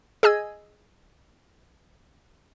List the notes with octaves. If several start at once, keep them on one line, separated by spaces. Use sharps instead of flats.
G#4 D#5 G#5 E6 G#6